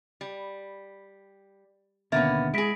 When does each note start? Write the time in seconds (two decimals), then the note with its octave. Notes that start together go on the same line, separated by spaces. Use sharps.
0.21 G3
2.12 D#2 B2 D3 A#3 B3 C#4 E5 A6
2.54 G#3 E4 G#4 A#6 B6 D7